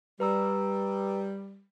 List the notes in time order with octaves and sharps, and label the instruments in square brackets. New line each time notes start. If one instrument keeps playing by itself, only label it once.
[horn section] G3 [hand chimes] B4 A#5 E6